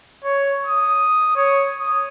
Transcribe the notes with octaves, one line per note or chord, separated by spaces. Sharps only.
C#5
D#6
C#5
D#6